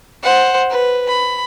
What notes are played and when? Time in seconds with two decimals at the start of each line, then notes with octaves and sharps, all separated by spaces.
0.23 C5 F#5
0.70 B4
1.08 B5